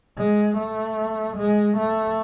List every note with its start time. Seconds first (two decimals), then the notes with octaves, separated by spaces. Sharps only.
0.18 G#3
0.58 A3
1.37 G#3
1.78 A3